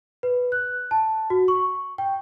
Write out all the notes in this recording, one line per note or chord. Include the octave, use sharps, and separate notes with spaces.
B4
F#6
A5
F#4
C#6
G5